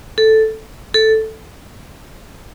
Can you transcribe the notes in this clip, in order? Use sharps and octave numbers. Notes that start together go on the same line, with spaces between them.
A4
A4